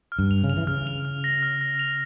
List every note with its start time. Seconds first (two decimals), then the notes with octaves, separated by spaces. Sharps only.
0.12 F6
0.19 G2
0.31 F7
0.44 C#3
0.50 F7
0.57 E3
0.67 C#3 F6
0.87 F7
1.05 F6
1.24 A#6
1.43 F6
1.61 A#6
1.79 F7